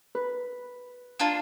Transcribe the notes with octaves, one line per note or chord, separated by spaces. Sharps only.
B4
A#3 D4 F4